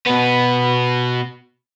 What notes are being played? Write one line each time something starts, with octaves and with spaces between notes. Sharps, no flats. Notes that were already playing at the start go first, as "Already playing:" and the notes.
B2 B3